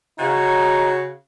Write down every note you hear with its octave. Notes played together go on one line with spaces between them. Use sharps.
C#3 D#4 F#4